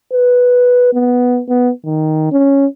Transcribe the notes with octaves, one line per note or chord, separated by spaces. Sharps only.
B4
B3
B3
D#3
C#4